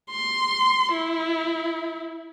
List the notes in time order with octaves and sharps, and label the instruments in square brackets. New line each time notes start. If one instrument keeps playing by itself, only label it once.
[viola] C6
E4